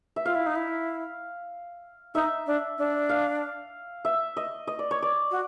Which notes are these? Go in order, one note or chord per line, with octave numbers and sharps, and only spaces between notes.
E5
F4 F5
E4
D#4
E4
D#4 E5
D4
D4
F5
E5
D#5
D#5
D5
C#5
D5
F#4